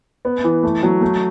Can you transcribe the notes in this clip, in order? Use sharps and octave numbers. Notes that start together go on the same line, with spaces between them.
B3
E3
A3
F#3
A3